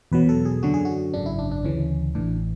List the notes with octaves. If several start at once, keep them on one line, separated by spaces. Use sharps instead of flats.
E2 B2 F#3 B4
A4
G#4
F#2 D3 F#3 F#4
G#4
F#4
G#1 F#2 C#3 D4
E4
D4
D4
D2 C#3 E3 C#4
A1 A2 E3 D4